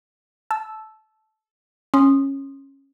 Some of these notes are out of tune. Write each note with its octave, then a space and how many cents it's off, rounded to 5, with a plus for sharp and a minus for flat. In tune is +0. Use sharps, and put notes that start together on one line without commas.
A5 -15 E6 +0
C#4 -15 C6 +5 D#6 -15